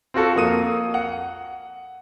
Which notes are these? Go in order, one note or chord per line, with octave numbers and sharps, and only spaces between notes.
C4 F4 F#4 A4
F2 A#3 D#6 D#7
F#5